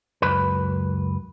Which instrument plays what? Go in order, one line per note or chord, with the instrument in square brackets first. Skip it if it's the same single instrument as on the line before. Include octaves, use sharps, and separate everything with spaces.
[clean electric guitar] C#2 F#2 B4